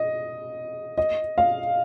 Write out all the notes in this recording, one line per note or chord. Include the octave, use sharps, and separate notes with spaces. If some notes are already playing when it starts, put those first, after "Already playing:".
Already playing: D#5
D#5
F5